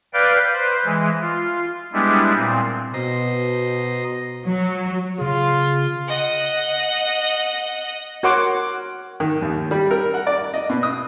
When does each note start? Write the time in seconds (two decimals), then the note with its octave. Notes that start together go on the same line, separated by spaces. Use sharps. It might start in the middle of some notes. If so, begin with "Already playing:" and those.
0.14 B4 D5 F5 G5
0.53 B4 C5
0.86 E3 G#3
1.21 F4
1.93 G3 G#3 B3 D4 E4
2.36 A#2 C4
2.94 B2 C5 D#5 A#5
4.45 F#3
5.19 C#3 F4 G#4
6.08 D#5 F#5
8.23 F#4 A#4 C#5 F#5 C6 D6
9.20 D#3
9.42 D#2
9.71 G3
9.91 A#4
10.14 F#5
10.27 D5
10.54 D#5
10.70 B2
10.83 D#6